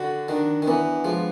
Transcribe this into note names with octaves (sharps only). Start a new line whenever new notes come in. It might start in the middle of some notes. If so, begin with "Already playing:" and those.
Already playing: D3 F#4
D#3 D4
D#3
E3 B3
F3 G#3